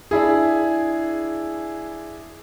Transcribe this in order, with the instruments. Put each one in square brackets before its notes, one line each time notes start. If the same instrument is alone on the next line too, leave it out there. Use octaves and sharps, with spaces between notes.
[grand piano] D4 E4 G#4